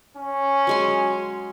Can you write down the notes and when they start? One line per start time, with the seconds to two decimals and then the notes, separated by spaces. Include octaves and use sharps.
0.17 C#4
0.67 F#3 G#3 C6